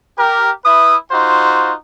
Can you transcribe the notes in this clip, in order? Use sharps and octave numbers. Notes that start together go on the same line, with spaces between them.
G4 A#4
E4 B4 E5 D#6
D#4 F4 F#4 C5